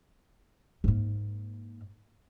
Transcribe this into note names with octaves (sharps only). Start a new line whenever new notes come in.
G#2 A#3